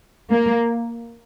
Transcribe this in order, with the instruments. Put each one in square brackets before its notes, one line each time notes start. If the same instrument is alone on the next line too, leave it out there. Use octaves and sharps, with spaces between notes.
[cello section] A#3